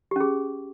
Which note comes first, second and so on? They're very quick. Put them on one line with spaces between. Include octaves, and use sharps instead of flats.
G4 C#4 G#4